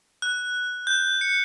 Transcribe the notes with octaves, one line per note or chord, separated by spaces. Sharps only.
F#6
G6
C#7